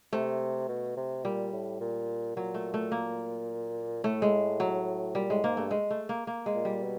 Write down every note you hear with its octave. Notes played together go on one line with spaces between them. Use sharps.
C3 A3
B2
C3
A#2 G3
A2
A#2
A#2 F#3
A3
A3
A#3
A2 A3
G#3
F#3
A#2 G3
A2 G#3
G#2 A#3
G2 A3
G#3
A3
A#3
A#3
G#3
A#2
G3
B2